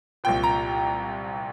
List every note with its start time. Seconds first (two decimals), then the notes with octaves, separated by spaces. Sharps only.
0.24 C2 A#2 F3 G5
0.44 A#5